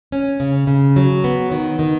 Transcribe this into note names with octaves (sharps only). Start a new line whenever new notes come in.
C#4
C#3
C#3
F#3
B3
D#3
D#3